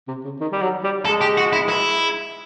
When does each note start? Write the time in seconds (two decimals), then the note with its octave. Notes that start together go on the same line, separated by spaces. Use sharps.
0.08 C3
0.25 C#3
0.41 D#3
0.52 G3
0.62 F#3
0.84 G3
1.05 G#3 A4
1.21 G4
1.37 F#4
1.53 E4
1.69 E4